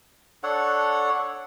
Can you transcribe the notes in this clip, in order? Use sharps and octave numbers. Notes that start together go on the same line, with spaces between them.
D4 A4 C#5 F#5